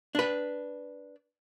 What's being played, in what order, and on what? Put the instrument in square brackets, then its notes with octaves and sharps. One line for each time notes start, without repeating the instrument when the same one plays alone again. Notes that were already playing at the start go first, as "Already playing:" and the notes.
[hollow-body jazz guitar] D4 B4